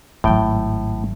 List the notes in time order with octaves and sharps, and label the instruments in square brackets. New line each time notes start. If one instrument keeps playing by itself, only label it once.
[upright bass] G#1 F#3 [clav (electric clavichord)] A2 G5